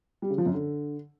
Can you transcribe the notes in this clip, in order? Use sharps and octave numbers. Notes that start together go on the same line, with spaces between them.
G3
C#3
F3
F#2
D3